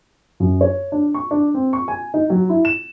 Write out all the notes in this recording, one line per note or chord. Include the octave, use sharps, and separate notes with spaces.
F#2
C#5
D4
C#6
D4
C4
C#6
G#5
D#4
F#3
E4
E7